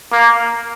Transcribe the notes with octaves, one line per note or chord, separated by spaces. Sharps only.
A#3